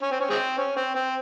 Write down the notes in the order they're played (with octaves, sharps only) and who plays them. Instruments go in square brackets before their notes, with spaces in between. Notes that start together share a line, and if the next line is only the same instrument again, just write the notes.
[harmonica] C#4
C4
C#4
G#3 C4
C#4
C4
C4